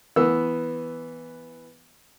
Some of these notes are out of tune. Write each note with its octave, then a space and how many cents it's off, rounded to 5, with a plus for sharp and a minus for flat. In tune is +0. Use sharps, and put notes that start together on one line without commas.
E3 +0 B3 +0 E6 +0